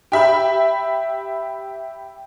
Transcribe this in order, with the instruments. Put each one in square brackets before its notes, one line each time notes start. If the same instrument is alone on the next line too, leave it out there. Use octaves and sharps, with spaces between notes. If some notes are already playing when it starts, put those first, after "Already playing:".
[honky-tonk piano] G4 E5 B5